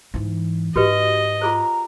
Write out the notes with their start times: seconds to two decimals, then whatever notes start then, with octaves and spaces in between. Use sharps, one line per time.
0.14 G#2 E3
0.76 G#2 F#4 G4 B4 D#5
1.41 F4 G#4 C5 A#5